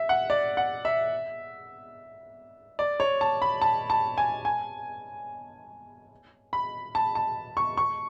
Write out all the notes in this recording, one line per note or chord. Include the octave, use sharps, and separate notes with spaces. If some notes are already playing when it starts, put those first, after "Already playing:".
Already playing: E5
F#5
D5
F#5
E5
D5
C#5
A5
B5
A5
A5
G#5
G#5
B5
A5
A5
C#6
C#6